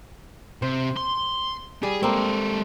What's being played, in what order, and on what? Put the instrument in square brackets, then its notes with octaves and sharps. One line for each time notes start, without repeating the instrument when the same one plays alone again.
[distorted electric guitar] C3 [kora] C5
[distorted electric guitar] C6
[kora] G3 [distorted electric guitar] G#4
[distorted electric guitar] G#3 A4 [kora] A#3 C4